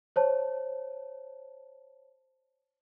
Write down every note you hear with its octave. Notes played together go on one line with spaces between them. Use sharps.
C5 C#5 A5